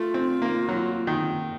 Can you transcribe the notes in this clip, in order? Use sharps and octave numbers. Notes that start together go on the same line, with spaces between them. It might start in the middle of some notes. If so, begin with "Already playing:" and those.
Already playing: A3 F4
C4
A#3
F#3
D#3